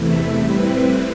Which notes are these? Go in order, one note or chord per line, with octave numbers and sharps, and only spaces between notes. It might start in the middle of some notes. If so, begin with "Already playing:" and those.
Already playing: E2 C3 E3 A3 E4
A2 G3 C4 E4 B4